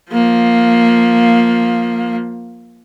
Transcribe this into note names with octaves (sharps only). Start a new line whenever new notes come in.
F3 A#3